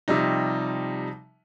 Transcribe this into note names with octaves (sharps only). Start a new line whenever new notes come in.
C3 F3 G3 D#4